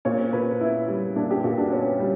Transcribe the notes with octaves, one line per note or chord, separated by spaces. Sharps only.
A#2 C#5
A#2 B4
B3 E4
G3
A#2 D4
G4
A#2 F#4
D4
B3 C#4
G3